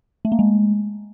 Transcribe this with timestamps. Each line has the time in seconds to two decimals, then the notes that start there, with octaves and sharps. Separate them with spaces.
0.25 A3
0.32 A#3
0.39 G#3